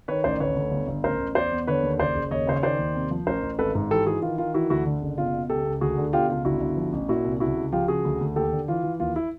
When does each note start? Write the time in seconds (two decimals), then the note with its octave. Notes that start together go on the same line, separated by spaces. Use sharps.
0.08 D#3 B4 C#5
0.24 A1 C5 D5
0.40 D2 B4 C#5
0.56 D2
0.72 G1
0.88 G1
1.04 A1 A#4 C5
1.19 A1
1.35 E2 C5 D5
1.51 E2
1.67 D3 B4 C#5
1.83 D#2
1.99 F#1 C5 D5
2.15 F#1
2.31 D#2 C#5 D#5
2.47 C#3 C5
2.56 C#5
2.63 D#3 C5 D5
2.79 D#2
2.95 C3
3.11 F3
3.27 A1 A#4 C5
3.43 A1
3.58 G#1 A4 B4
3.75 G#2
3.91 E3 G4 A4
4.06 E3 F#4 G#4
4.22 D#3 F4
4.38 D#3 F4
4.54 E3 E4 F#4
4.70 D2 E4 F#4
4.86 D3
5.02 F#1
5.18 B2 F4
5.34 B2
5.50 C#2 G4 A4
5.65 C#2
5.81 D2 F#4 G#4
5.98 D3
6.13 B2 F4 G4
6.29 C#2 F4
6.45 G1 E4 F#4
6.61 G1
6.77 F3
6.93 A1
7.08 A#2 E4 F#4
7.25 C2
7.40 C#2 E4 F#4
7.57 C#2
7.72 F3 F4 G4
7.88 C#3 F#4 G#4
8.04 D2
8.20 D2
8.36 D#2 G4 A4
8.52 D3
8.68 E3 F4
8.84 E3
9.00 D#2 F4
9.16 E4